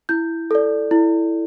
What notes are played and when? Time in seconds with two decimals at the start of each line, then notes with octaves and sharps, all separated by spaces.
0.09 E4 G6
0.51 A4 D5
0.91 E4